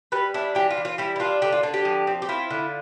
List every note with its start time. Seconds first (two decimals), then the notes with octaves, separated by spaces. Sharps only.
0.12 G3 B4
0.34 D4 E4
0.55 E3 G4
0.70 F4
0.77 E3
0.85 F4
0.98 G3 E4
1.16 E4
1.20 D4 F4
1.42 D3 G4
1.52 F4
1.63 D3
1.74 G4
1.85 F3
2.07 C4
2.22 G4
2.29 E4 F4
2.50 D3